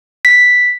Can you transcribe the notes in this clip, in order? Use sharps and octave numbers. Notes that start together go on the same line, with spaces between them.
B6